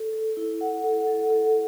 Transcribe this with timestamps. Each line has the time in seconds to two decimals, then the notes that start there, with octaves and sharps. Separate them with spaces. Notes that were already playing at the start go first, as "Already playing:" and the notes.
Already playing: A4
0.13 A4
0.37 E4
0.61 F#5
0.84 A4
1.07 A4
1.30 A4